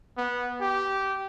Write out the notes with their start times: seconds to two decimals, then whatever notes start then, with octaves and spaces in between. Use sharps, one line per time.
0.18 B3
0.61 G4